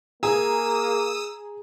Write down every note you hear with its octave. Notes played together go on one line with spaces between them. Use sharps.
A#3 G#4 G#5 A#5 D#6 E6